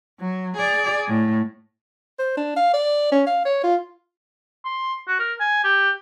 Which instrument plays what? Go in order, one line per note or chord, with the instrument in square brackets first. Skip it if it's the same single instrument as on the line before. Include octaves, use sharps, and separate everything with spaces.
[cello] F#3
G#4 D5
A2
[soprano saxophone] C5
D4
F5
D5
C#4
F5
C#5
F4
[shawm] C6
F#4
A#4
G#5
G4